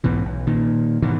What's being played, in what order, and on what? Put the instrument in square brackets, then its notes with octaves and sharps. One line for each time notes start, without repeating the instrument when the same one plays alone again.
[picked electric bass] B1 G#2 B2 E3
B1
A#2 D#3
G#2 B2 D#3 E3